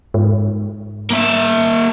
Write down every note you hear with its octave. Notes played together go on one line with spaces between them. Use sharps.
G#2
A#3 E5